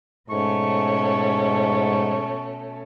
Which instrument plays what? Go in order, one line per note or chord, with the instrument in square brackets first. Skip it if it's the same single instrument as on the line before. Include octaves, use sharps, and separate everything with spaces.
[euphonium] G#2 [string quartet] B2 A3 C#4 [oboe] C#6